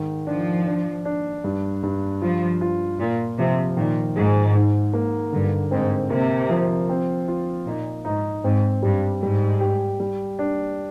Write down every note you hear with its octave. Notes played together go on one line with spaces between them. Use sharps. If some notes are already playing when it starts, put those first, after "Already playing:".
Already playing: G#2 D#3
F3 D4
D4
D4
G2
G2
F3 F4
F4
A#2 F4
C3 F3
A#2 D#3
G#2 G#4
G#2
A#3
G2 D3
G#2 C4
C3 A#3
F3
C4
F4
A#2 D#4
G#2 D#4
G#2 C4
G2 G3
G#2 G3
G4
G3
D4